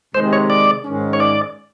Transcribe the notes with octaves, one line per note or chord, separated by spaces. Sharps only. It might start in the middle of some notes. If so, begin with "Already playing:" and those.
C3 D#3 G#3 C5
C#5
D5
G#2 D#3 G#3 C#4
C#5
D5